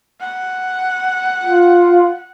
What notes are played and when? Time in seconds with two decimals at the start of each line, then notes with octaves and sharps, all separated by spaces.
0.20 F#5
1.43 F4